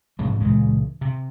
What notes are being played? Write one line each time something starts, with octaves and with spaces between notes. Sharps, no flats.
G#2 C3 F3 F#3
C#2 A#2 E3 G#3
C3